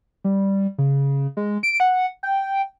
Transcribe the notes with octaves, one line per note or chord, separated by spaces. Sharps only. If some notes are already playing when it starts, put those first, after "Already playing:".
G3
C#3
G#3
D7
F#5
G5